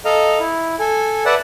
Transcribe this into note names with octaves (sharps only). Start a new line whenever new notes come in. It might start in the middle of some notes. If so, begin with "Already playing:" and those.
A4 D#5 F5 A#5
E4
A4 G#5
B4 D5 E5 F#5 A5